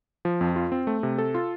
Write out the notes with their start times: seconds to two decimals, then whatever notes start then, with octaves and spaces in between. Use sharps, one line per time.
0.25 F3
0.41 F2
0.56 F4
0.72 C4
0.87 A3
1.03 C3
1.18 A4
1.35 F4